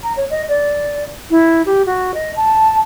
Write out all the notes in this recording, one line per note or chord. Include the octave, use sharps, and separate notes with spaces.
A#5
C#5
D#5
D5
E4
G4
F#4
D#5
A5